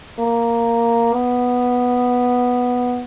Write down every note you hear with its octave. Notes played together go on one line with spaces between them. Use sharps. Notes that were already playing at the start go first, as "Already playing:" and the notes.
A#3
B3